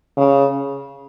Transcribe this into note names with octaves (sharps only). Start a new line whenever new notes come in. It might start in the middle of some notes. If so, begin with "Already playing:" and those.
C#3